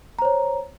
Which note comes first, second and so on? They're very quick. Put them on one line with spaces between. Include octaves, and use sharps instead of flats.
A#5 C5 C#5